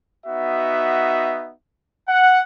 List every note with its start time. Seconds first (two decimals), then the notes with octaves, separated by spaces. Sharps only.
0.25 B3 D#4 F#4 E5
2.08 F#5